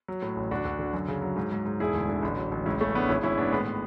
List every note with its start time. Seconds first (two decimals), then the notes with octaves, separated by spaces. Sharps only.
0.08 F#3
0.22 A2
0.36 A1
0.51 D2 D4 F#4
0.65 D2
0.79 D3
0.93 F#2
1.08 C#3
1.22 F#3
1.36 G#2
1.52 G#2
1.65 G#2
1.80 E1 E4 G#4
1.94 D2
2.09 D3
2.22 A1
2.37 F#3
2.52 A1
2.66 C#2 C#4 E4
2.80 C#2 A3 C#4
2.94 C#2 B3 D4
3.09 G#1 C#4 E4
3.23 G#1 C#4 E4
3.38 G#1 B3 D4
3.52 A2 G#3 B3
3.66 A2